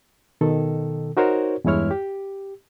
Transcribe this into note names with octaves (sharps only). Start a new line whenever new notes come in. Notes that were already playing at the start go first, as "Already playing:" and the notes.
B2 D#3 A4
D#4 F#4 A#4 C5 C#5
E2 G2 G#3 E4 C#5 F6
G4